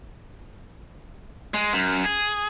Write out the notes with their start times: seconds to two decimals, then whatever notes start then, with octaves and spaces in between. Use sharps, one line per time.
1.54 G#3
1.73 F#2
2.05 G#4